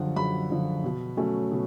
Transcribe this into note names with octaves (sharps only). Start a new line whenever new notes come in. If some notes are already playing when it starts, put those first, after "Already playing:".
Already playing: F#2 D3 F3 F#5
F#2 B5
D3 F3
B2
F#3 A3 C#4
B2